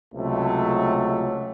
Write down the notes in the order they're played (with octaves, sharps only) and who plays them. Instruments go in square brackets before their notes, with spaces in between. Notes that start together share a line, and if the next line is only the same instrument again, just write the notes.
[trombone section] C#2 C3 F#3 A3